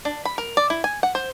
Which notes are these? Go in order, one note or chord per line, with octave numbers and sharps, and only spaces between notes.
D4
B5
A#4
D5
E4
G#5
F#5
C5